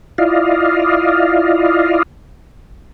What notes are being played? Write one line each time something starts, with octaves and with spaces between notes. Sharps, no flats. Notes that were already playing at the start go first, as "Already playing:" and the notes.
E4 F4 D5 D#5 F5